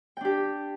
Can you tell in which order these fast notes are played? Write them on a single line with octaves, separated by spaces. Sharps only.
G5 D4 G4